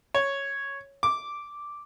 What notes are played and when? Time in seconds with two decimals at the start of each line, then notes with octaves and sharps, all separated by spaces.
0.14 C#5
1.03 D6